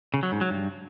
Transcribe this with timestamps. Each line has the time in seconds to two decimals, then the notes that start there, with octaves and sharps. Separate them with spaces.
0.14 C#3
0.23 F#3
0.32 G#2
0.41 F#3
0.50 G2